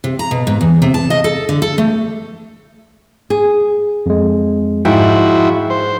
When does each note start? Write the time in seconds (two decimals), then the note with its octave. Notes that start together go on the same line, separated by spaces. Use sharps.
0.04 C3
0.19 A#5
0.31 B2
0.47 G#2
0.61 E2
0.82 C3
0.94 A5
1.10 D#5
1.24 A4
1.49 D3
1.62 A4
1.78 A3
3.30 G#4
4.06 F2 G#3
4.85 G#2 F3 E4 F#4 G5
5.70 C5